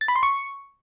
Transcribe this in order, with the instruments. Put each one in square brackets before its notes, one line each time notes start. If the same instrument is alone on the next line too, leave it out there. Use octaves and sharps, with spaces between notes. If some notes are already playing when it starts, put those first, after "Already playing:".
[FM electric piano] A6
B5
C6
C#6